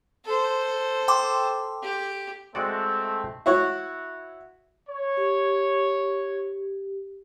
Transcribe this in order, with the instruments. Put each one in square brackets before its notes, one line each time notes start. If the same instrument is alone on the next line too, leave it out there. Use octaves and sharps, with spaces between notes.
[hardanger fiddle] A4 C5
[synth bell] G5 C6 D6
[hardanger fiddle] G4
[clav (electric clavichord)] G#3 F#4 D5 [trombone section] A3 C4
[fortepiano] E4 F#4 C#5
[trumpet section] C#5
[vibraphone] G4